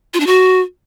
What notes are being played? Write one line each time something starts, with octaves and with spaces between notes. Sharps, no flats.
F4
D4
F#4